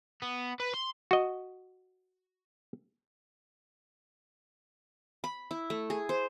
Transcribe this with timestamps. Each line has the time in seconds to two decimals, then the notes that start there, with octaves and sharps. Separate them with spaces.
0.22 B3
0.60 B4
0.74 C6
1.11 F#4 D#5
5.24 B5
5.51 E4
5.70 A3
5.90 G#4
6.09 C5